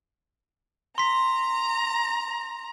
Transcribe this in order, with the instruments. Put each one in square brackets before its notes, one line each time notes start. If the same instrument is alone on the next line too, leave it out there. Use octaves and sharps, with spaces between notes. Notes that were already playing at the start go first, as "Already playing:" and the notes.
[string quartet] A#5 [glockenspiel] C6 B6